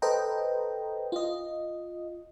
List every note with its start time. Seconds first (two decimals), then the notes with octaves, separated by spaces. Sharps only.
0.02 A4 B4 C5 D#5 G5 A#5
1.12 F4 D#5